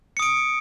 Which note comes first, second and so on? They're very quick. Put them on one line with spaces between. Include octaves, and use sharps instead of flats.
C#7 D#6 D7